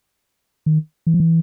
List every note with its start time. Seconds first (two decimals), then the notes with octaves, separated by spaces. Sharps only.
0.66 D#3
1.07 E3
1.14 F3
1.20 E3